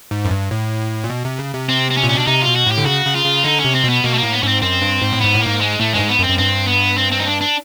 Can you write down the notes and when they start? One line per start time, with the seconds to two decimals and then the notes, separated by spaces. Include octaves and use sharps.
0.11 G#2
0.25 F#2
0.31 G2
0.51 A2
1.04 A#2
1.10 B2
1.25 C3
1.39 C#3
1.54 C3
1.69 C4
1.91 C4
1.97 C#4
2.04 A#2
2.09 C#4
2.15 B2 D4
2.27 C3 D#4
2.41 F4
2.47 B2
2.56 F#4
2.66 A2 G4
2.78 D3
2.86 C#3 F#4
3.05 C#3
3.15 F4
3.25 C#3
3.44 D3 D#4
3.60 C3 C#4
3.75 C4
3.84 B2
3.89 B3
4.03 B2 A#3
4.14 A3
4.18 A2 A#3
4.32 B3
4.43 G#2 C4 C#4
4.62 F#2 C4
4.82 G2
5.02 G#2
5.13 A2
5.21 G#2 B3
5.35 A2
5.41 A#3
5.46 G#2
5.61 G#3
5.80 A2 A3
5.94 G2 G#3
5.99 G#2
6.09 B3
6.19 F#2
6.24 C4
6.29 F#2
6.38 G2 C4
6.67 B3
6.97 C4
7.12 C4
7.20 D#4
7.27 D4
7.41 D4